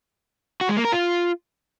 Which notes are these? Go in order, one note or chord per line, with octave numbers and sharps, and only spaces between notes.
F#4
G#3
A#3
A#4
F4